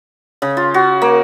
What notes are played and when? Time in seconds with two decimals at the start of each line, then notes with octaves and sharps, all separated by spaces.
0.42 C#3
0.57 F4
0.74 F#4
1.02 A#3